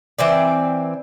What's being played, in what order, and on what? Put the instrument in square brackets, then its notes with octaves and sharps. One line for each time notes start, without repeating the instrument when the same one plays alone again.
[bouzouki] E3 C4 D5